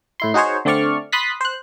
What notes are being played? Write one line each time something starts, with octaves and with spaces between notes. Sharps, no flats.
A2 E4 C6
D#4 F#4 G#4 C5 C#5
D3 A3 C4 D5 C#6 F6
B5 C6 D#6 F#6 A6 B6
C5 F#6